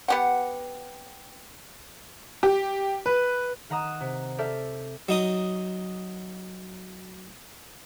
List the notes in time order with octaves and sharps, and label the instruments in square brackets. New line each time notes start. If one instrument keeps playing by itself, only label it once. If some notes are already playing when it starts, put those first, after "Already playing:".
[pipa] B3 G4 F#5
[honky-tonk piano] G4
B4
[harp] D#3 F#5 A#5 D#6 E7
C3
A4 D5 E5 F6 G6
[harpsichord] F#3 D#4 D#6